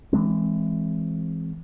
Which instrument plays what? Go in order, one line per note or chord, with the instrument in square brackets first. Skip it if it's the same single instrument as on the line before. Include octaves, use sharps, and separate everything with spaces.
[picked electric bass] E3 F#3 G#3 C4